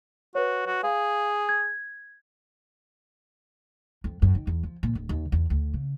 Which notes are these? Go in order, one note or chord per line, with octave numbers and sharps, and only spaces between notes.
F#4 B4 C#5
F#4
G#4 F5
G#6
F2
F#2
D#3
E2
F3
A#2
D1
D#2
E2
D2
C#3